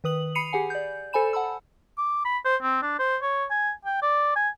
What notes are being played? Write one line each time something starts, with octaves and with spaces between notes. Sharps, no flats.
D#3 B4 D#6 F#7
B5 C7 C#7 D#7 F7
G4 G#4 F#5 G#5
D5 G6
A4 C5 G#5 B5 E7
F#5 A5 B5 E6
D6
B5
C5
C4
D4
C5
C#5
G#5
G5
D5
G#5